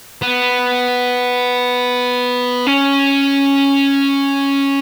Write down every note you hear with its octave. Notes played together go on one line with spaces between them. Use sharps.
B3
C#4